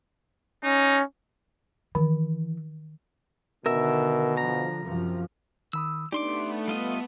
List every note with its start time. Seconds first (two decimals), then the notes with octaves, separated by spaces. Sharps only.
0.64 C#4 D#4
1.95 D#3 E3
3.66 B2 D3 D#3 A#4 E5
4.37 D3 F3 A#5
4.85 F#2 C3 F3
5.73 D#3 B5 D#6 E6
6.12 A3 B3 D4 D#4 G4 D5 C6 D6
6.68 G3 F4 D#5